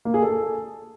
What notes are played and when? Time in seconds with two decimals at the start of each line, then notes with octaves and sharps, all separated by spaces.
0.05 A#3
0.14 G#4
0.23 A4